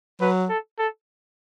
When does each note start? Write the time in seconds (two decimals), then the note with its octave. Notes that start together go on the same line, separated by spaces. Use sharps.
0.20 F#3 B4
0.49 A4
0.79 A4